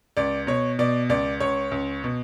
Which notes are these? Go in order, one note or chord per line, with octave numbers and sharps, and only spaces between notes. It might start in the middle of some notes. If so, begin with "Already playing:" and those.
C#2 D5
B2 C#5
B2 D5
C#2 D5
C#2 C#5
C#2
B2